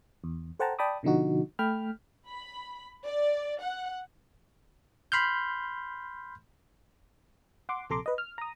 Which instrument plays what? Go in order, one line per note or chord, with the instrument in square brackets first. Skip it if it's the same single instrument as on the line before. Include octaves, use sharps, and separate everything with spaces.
[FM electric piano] E2
A4 C5 F#5 G5 A5 A#5
D5 G5 A5 B5 D6 D#6
B2 D3 F3 D#4 F#4
A3 G5 B5 F6
[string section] B5
D5
F#5
[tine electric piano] B5 C6 F6 G6
[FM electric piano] F#5 C6 D6
A#1 C3 A4 A#5 C6 D6
B4 D#5
F6
A#5 D#6